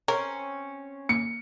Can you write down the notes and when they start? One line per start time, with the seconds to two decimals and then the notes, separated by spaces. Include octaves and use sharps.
0.08 C4 C#4 A#4
1.09 A#3 C#7